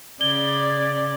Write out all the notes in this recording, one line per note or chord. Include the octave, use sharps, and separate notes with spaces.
C#3 D5 G#6 G7